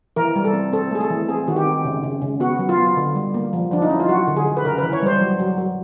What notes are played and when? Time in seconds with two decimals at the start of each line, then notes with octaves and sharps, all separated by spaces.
0.16 E3 A#4
0.36 G3
0.45 A4
0.53 C4
0.73 C4 A4
0.91 A3 G#4
1.00 A4
1.10 E3
1.29 C4 G#4
1.48 D#3 F#4
1.56 G4
1.66 C4
1.85 C#3
2.03 C#3
2.22 C#3
2.40 B3 F#4
2.59 F#3
2.69 F4
2.78 B3
2.97 D3
3.16 G3
3.34 A#3
3.53 F3
3.71 F3 D4
3.82 D#4
3.90 C#4 E4
4.00 F4
4.09 F#3 F#4
4.27 D3
4.37 G#4
4.47 D3
4.57 B4
4.64 C#3 A#4
4.78 B4
4.83 E3
4.93 C#5
5.02 G3 C5
5.21 F#3
5.40 F#3
5.58 F#3